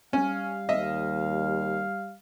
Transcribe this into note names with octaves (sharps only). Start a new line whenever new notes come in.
G3 C#4 F5
D#2 D#5 E5